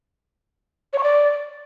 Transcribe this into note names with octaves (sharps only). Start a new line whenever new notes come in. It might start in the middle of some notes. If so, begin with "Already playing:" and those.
C#5
C#6
D5